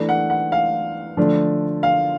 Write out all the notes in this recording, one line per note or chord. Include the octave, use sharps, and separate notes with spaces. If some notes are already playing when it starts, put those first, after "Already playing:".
Already playing: E3 A3 D4
F#5
F#5
F5
D3 F3 A3 D4
F5